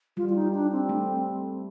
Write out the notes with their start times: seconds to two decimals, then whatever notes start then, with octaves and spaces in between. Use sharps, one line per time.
0.17 G3 F4
0.29 F4
0.35 D#4
0.54 D4
0.72 C4
0.89 A3